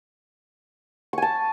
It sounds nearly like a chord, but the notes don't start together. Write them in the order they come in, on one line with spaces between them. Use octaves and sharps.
C#6 G#5 A5